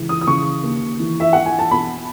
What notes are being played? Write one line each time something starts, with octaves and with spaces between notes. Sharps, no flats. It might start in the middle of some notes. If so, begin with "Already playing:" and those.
Already playing: C#2 E3
D#6
D#6
C#3 C#6
D#2
E3
E5
E3 F#5
G#5
A5
B2 B5